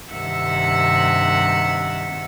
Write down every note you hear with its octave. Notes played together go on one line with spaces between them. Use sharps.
G2 C3 D#3 E5 F#5 E6